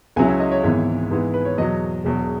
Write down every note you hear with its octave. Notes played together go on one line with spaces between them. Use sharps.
C#2 C#3 F#3 C#4 E4 G#5
E5
D#5
C#5
G#1 G#2 E3 B3 C#5
G#2 E3 G#3 B3
B4
C#5
E2 B2 F#3 D#5
E1 E2 B2 F#3